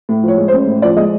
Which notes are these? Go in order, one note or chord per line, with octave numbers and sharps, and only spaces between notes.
A2
F3
C#5
G#3
C5
A1
A2
F3 D5
G#3 D#5